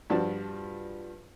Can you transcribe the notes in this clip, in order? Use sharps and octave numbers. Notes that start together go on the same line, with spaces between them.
G2 F3 D4 F#4 A5